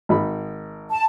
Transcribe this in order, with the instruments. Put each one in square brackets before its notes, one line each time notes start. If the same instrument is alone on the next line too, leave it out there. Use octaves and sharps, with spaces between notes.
[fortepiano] G#1 D#4 B5
[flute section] A5